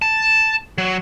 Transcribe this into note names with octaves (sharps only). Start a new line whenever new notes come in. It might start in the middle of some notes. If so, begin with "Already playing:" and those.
A5
F#3